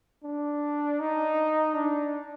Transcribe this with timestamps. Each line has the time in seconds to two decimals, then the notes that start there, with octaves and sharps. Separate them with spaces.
0.24 D4
1.00 D#4
1.75 D4